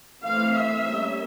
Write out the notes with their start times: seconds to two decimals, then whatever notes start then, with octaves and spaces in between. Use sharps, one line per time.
0.24 E3 A3 C4 F5
0.55 E5
0.85 G3 A#3 C#4